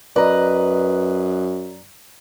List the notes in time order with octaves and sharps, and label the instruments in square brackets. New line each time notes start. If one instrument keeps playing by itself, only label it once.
[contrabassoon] F#2 [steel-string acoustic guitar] B4 D#5 [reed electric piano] D5 A#5